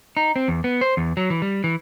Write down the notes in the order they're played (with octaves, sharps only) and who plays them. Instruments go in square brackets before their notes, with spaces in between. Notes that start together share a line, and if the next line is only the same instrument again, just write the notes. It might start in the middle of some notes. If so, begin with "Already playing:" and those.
[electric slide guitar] D#4
C4
E2
B3
C5
E2
F#3
E3
G3
E3